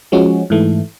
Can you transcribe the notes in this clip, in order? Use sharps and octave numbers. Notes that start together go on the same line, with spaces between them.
F3 G#3 C#4 F#4
G#2 E3 A3